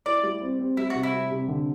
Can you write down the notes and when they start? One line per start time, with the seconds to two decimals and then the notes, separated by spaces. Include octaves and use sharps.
0.06 E4 D5
0.23 G3
0.41 C4
0.59 C4
0.77 G3 E4
0.90 F#4
0.95 C3
1.03 E4
1.13 G3
1.32 C3
1.48 D3